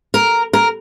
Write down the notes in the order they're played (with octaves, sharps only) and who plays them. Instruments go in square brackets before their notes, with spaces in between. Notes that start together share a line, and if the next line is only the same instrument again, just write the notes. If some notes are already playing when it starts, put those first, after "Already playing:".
[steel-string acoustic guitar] A#4
A#4